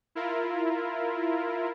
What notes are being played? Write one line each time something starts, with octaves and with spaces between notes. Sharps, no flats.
E4 F4 A#4